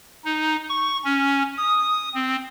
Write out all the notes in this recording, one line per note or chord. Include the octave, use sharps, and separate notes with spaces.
D#4
C#6
C#4
D#6
C4